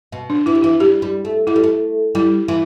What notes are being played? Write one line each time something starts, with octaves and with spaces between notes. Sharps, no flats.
B2
D4
E3 E4
G3
E3 E4
G3 G4
G3
A3
A3 E4
G3
A3
G3 E4
E3 E4